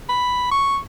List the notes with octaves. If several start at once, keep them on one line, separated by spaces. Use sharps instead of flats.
B5
C#6